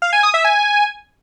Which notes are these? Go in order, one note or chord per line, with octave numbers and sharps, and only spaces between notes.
F5
G#5
D#6
E5
G#5